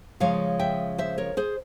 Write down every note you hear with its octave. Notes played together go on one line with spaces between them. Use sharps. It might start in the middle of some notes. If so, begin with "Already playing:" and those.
C#3 F3 G#3 C#5 F5
E5 G5
C5 E5
A#4 C#5
G#4 C5